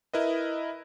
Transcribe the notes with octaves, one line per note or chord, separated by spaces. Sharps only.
E4 A#4 B4 D#5